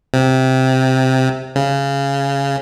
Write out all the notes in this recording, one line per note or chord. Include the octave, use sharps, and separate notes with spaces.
C3
C#3